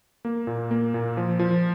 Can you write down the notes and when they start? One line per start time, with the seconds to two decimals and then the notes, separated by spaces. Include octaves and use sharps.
0.25 A#3
0.47 A#2
0.71 A#3
0.94 A#2
1.17 F3
1.39 F3